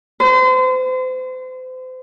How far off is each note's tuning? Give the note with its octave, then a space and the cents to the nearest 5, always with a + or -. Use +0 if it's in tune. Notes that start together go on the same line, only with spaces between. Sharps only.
C5 -35